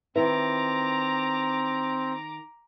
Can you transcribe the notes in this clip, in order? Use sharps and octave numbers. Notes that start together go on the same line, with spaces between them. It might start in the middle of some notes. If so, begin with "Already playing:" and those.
D#3 C4 E4 B4 A#5 D6